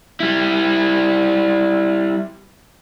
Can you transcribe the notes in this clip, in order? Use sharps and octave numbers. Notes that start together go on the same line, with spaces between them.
G3 E4